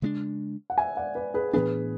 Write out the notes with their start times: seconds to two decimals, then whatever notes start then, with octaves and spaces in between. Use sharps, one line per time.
0.02 C#3 G#3 B3 D4
0.70 F#5
0.78 E5 G#5
0.97 D5 F#5
1.15 B4 D5
1.34 G#4 B4
1.53 A2 E3 B3 D4 G#4 B4